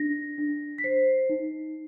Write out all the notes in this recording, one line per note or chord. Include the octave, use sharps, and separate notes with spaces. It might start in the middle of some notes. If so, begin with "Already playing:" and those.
Already playing: D4 A#6
D4
B6
C5 C7
D#4